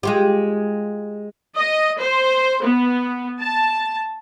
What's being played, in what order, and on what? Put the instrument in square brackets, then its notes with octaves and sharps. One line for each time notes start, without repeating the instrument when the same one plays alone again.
[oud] G#3 F4 G4
[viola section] D#5
C5
B3
A5